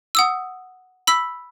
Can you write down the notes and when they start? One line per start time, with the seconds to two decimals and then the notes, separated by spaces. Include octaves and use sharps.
0.15 F#5 D#6 E6
1.07 B5 E6 B6